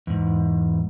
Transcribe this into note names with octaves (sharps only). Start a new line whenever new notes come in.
E2 G#2